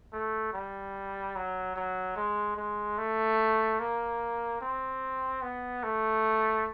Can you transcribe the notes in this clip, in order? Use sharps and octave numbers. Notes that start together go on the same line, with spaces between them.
A3
G3
F#3
F#3
G#3
G#3
A3
A#3
C4
B3
A3